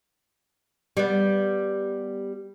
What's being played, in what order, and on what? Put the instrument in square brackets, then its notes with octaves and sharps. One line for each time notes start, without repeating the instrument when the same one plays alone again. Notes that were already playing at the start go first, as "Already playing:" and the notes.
[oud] G3 B3